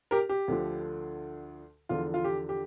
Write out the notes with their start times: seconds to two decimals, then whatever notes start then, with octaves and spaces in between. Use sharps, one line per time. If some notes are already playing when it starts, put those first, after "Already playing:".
0.11 G4 A#4
0.29 G4
0.48 D2 D3 F3
1.89 E2 D3 F3 F4
2.14 F4
2.24 G4
2.49 G4